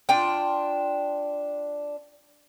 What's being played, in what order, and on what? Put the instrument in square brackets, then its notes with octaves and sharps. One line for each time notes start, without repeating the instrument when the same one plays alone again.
[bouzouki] D4 F4 G5